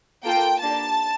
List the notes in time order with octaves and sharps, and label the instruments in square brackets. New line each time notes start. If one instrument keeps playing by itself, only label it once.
[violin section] A#3 F4 A4 G5
A#3 D4 G4 A5